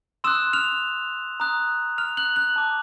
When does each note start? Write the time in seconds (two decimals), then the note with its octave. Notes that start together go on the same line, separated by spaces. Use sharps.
0.24 C6 D#6 E6 F#6 E7
0.53 F6 F7
1.40 A#5 D#6 F#6
1.98 F6 F7
2.17 F#6 F#7
2.36 F#6 F#7
2.56 A5 D6 F#6